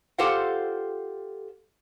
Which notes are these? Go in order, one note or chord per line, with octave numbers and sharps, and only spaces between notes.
F4 G4 A4 C5 F5 F#5